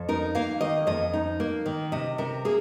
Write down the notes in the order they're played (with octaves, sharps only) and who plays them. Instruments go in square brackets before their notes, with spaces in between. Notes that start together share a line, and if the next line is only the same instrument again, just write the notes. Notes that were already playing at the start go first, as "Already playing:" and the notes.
Already playing: [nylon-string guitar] F2
D#4 A#4
A#3 F5
D#3 D#5
F2 D#5
D#4
A#3
D#3
C3 D#5
C3 A#4
A#3 G#4